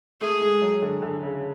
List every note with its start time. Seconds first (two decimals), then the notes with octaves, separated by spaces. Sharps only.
0.21 A3 G#4
0.41 G#3
0.62 F#3
0.82 D3
1.02 D3
1.23 C#3